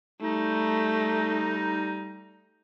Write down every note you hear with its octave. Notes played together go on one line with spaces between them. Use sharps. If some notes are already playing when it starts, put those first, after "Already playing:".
G3 A3 D#4